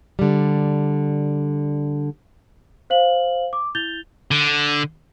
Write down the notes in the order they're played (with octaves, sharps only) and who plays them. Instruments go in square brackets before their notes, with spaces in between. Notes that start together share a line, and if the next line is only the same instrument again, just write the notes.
[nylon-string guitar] D3 G3
[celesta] C5 F5 F#7
D6
E4 G6 A6 F7 G7
[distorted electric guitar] D3